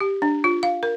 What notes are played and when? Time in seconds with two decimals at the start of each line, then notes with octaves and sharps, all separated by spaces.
0.01 G4
0.22 D4
0.44 F4
0.63 F5
0.83 A#4